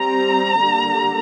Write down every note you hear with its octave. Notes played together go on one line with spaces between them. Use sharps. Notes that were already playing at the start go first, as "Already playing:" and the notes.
Already playing: G3 C4 A#5
D3 G3 A#3